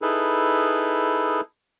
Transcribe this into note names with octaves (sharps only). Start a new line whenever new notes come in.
D#4 E4 G#4 A4 B4